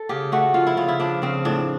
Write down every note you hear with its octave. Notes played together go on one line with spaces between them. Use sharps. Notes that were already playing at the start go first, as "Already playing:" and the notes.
Already playing: A4
C#3 G4
A3 F#4
F3 F4
E4
C#3 F4
E4
F3 D4
C#3 C4
A2 D4